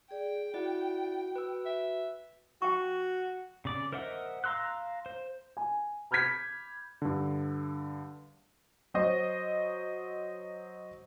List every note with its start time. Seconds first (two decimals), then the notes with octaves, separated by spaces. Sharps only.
0.11 G#4 D5 G5
0.54 E4 F#4 D5 F#5
1.36 B4 E6
1.66 E5
2.62 F#4 G5 C#6
3.65 C#3 D5 D6
3.93 A#4 C5 D#5 E5 F#5
4.44 F5 A#5 C6 E6 F#6
5.06 C5
5.57 G#5
6.11 B5 F6 G6 G#6 B6
7.02 G2 D3
8.94 F#3 C5 D#5